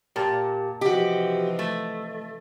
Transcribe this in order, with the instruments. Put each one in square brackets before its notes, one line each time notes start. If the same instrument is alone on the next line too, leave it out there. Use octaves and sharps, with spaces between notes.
[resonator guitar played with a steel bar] A#2 [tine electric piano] G4 A#4 A5
[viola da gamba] C3 E3 F3 [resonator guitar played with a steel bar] F#4 G4 [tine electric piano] D#5
[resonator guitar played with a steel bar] A3